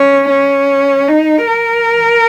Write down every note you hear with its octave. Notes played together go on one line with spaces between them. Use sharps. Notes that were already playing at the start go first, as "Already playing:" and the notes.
Already playing: C#4
C#4
D#4
A#4